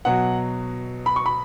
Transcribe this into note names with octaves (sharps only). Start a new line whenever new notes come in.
B2 F#3 F#5
B5
C#6
B5